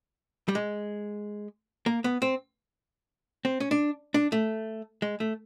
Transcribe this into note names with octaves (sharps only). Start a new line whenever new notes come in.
G3
G#3
A#3
B3
C4
C4
C#4
D4
D4
A3
G#3
A3